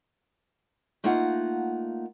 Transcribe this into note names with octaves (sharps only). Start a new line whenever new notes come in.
A3 A#3 D#4 F4 F#5